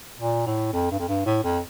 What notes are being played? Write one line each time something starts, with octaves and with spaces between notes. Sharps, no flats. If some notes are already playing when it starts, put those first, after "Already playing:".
A#2
A2
F2
G2
F2
G2
A2
F2